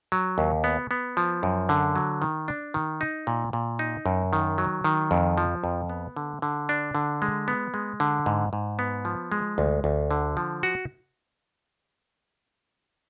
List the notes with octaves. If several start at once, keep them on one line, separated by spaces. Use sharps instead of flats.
F#3
D#2
B3
B3
F3
F#2
D3
F#3
D#3
D4
D#3
D#4
A#2
A#2
D#4
F#2
D#3
F#3
D#3
F2
F3
F2
B3
D3
D3
D4
D3
G#3
B3
G#3
D3
G#2
G#2
B3
F3
G#3
D2
D2
D3
F3
F#4